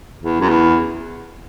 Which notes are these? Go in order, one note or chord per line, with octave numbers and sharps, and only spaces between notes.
E2
F#2
E2